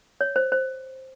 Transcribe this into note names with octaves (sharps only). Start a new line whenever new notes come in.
C#5
C5
C5